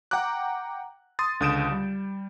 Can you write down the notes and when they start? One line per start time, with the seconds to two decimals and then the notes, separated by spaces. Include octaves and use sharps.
0.11 F#5 G5 A#5 D6 F#6
1.19 C6 D#6 A6
1.40 C#2 D3 D#6 G6 D7 E7
1.71 G3